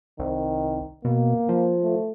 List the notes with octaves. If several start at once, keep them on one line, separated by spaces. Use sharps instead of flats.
C2 D#3
B2 A#3
F3
A3